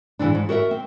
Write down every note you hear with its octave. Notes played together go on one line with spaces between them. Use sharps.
G#2 E3 C4 D4
G#2
F#4 A#4 D#5 E5
C4